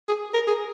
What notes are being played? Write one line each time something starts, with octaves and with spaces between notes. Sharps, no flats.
G#4
A#4
G#4